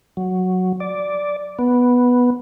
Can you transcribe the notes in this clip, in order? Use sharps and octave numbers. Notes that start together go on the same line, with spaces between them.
F#3
D5
B3